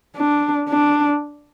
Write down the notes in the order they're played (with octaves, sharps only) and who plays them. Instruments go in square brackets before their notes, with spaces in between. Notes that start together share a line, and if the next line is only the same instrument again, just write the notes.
[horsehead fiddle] D4
D4